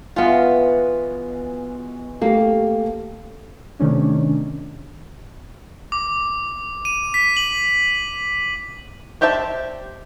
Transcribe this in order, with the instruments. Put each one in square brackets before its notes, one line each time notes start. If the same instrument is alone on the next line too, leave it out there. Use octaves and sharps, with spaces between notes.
[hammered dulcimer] B2 E3 G#3 [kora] B3 F4
[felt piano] A3 G4 [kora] A#3 [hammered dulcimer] A4
[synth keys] C3 D#3 A3 C#4 D4
[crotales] D6
D#7
B6
F#7
[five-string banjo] D4 G4 C5 E5 A5